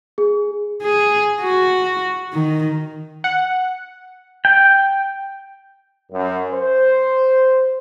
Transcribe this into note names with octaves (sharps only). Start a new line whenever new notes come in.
G#4
G#4
F#4
D#3
F#5
G5
F#2
C5